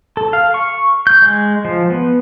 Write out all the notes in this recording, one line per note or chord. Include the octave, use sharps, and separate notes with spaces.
A4
F5
C#6
G6
G#3
F3
B3